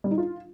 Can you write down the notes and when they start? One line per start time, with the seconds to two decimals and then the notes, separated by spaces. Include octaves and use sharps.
0.04 G3
0.11 D#4
0.18 F4